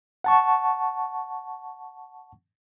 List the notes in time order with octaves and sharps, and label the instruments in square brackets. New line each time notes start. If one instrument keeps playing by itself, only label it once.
[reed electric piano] F#5 A5 C#6